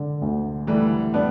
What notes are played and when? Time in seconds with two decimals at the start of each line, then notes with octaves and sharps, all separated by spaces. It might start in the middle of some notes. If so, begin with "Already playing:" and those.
Already playing: D3
0.22 D2
0.67 E3 G3 A3
1.14 G3 B3 D4